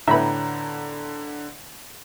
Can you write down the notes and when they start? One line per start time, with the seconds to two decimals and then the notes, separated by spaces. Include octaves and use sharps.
0.08 A2 D3 B3 E5 A#5 B5